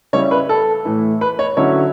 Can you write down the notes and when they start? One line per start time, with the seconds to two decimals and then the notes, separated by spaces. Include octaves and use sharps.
0.13 C#3 G3 C#4 E4 C#5
0.31 B4
0.49 A4
0.85 A2 E3 A3 E4
1.21 B4
1.39 C#5
1.57 D3 F#3 C#4 E4 C#5